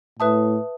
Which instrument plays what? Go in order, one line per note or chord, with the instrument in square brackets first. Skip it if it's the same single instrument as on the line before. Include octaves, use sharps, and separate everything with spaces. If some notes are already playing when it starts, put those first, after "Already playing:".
[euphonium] A2 [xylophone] B4 E5 A5 D#6